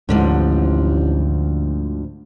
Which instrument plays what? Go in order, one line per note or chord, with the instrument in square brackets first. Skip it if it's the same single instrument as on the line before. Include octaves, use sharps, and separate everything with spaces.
[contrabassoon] A1 [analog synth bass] D2 [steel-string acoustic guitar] G#2 D3 F3